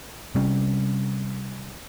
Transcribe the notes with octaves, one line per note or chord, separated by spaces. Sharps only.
C3 G3 C#4